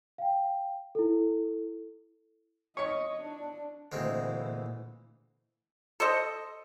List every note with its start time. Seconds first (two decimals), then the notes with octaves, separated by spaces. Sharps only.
0.18 F5 G5
0.95 E4 A4
2.77 C#5 D#5 C#6
3.21 D4
3.92 D2 A#2 E3 G#3 C4
6.00 A4 C5 D#5